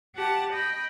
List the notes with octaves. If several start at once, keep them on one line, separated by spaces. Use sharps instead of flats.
G4 F#5 A5
D#5 G5 B5